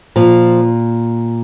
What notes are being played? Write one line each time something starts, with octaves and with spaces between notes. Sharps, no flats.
A#2 F3